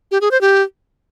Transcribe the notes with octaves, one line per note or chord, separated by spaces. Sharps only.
G4
G#4
C5
G4